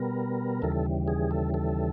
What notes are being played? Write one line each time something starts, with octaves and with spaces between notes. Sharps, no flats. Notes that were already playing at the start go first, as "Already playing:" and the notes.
Already playing: B2 G3 B3 A#4
D#2 C#3 E3 G3 A4
G#4
A4
A4